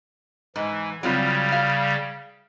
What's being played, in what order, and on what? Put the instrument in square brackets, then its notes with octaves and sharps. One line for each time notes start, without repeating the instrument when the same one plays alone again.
[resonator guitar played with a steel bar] G#2 [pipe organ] E3
[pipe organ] C#3 G3 [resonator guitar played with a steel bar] F#3 C4 F4
[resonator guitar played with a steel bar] F5